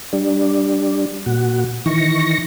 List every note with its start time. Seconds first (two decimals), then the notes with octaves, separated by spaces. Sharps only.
0.13 G3 D4
1.26 A#2 F#4
1.86 D#3 E3 C#6 A#6